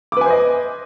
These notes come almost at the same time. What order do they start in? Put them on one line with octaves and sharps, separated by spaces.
D6 B4 G#5 C5 D#5